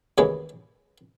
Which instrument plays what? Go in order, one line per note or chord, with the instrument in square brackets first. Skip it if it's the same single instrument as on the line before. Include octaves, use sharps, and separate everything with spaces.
[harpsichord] D#2 C#3 E3 G#3 C#5